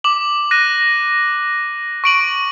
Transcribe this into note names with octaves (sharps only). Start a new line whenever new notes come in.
D6 F#7
F#6 A#6 D#7
C#6 D7 F#7